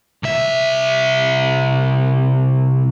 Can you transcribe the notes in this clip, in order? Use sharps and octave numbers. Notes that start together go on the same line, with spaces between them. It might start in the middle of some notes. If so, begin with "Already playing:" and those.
C2 E5